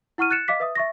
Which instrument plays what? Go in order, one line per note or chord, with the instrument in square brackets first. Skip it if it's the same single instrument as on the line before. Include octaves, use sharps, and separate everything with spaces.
[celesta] E4 F#5 C#6 F6 D#7
F#6 A6 C#7 E7
D#5 F5 D6 B6
B4 E5 D#6
E5 C#6 A#6